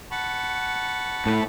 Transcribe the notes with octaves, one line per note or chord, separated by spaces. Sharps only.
F#5 A5 B5 C#6
A2